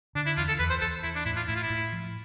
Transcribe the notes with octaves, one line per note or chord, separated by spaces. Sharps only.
D3 D4
E4
E2 F4
A4
E2 B4
C5
E2 A4
E3 E4
D4
A2 E4
F4
A2 E4
F4
E4
A2
F3